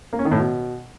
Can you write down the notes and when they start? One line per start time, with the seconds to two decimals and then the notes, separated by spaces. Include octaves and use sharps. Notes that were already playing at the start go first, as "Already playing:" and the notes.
0.13 A#3
0.19 C#4
0.25 D#3
0.31 A2
0.38 B2